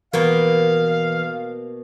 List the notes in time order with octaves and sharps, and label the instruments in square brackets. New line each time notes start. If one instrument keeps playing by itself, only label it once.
[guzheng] B2 A#3 B3 [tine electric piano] E3 A#4 B4 [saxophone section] F5